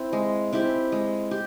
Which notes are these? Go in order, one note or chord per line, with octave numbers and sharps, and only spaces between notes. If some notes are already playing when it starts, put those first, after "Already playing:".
Already playing: C4 E4
G#3
C4 E4 G4
G#3
G4